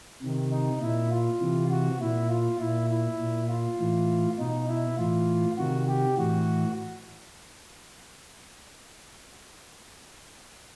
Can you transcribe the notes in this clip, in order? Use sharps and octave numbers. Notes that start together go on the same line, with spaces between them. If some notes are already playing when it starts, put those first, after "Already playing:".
C3 D#3
D#4
A#2 E4
F4
C3 E3
F#4
A#2 E4
F4
A#2 E4
E4
A#2
F4
A2 E3
B2 D#4
E4
A2 E3 F4
C3 D#3 F#4
G4
A2 E3 F#4